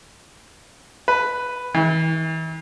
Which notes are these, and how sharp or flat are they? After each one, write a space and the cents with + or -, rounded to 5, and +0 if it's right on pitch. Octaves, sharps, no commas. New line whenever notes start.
B4 +5
E3 -40